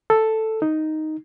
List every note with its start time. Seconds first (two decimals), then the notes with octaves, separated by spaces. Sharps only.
0.10 A4
0.62 D#4